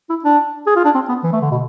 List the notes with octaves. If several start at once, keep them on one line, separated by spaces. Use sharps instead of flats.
E4
D4
G#4
F4
D4
C4
B3
E3
A3
D3
B2